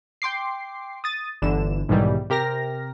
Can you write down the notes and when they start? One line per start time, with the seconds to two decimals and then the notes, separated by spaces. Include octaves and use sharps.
0.22 G5 C6 D6 C7
1.04 D#6 A6 D#7
1.42 G1 D3 E3 E7
1.89 B1 G#2 B2 D#3 E3 G3
2.30 C3 G4 A#4 F6 A#6